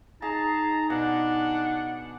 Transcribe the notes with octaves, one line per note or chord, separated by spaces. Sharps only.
D#4 G#4 A5 A#5
B2 D4 F#5